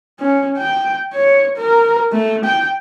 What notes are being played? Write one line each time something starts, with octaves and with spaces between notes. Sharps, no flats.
C#4
G5
C#5
A#4
A3
G5